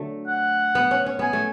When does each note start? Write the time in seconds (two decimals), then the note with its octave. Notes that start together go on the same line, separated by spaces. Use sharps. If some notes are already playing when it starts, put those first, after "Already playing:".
Already playing: D3 F#3 A3
0.28 F#5
0.75 B3
0.91 C#4
1.06 C#4
1.19 B3 G#5
1.33 A3